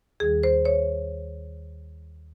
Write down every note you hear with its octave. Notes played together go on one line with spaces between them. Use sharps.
D#2 D#3 G3 G#4
C5
C#5